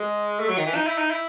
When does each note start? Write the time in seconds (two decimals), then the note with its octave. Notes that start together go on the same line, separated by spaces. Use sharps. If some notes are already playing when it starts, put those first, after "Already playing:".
Already playing: G#3
0.40 A3
0.49 F#3
0.58 D#3
0.66 E3
0.75 D#4
0.87 E4
0.98 D#4
1.11 E4